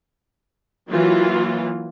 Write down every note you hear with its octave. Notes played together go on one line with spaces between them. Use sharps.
E3 F#3 A#3 F4